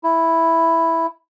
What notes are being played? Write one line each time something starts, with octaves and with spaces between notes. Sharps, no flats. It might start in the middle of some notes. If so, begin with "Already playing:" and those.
E4